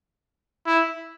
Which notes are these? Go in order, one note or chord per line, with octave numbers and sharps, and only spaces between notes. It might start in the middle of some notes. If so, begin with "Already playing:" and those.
E4